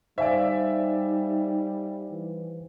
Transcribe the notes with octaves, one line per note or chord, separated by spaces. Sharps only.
G3 D#4 C5 D5 E5 F5 G#5
E3